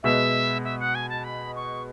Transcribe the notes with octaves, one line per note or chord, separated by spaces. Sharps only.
B2 G#3 B3 E5
E5
F#5
G#5
A5
B5
C#6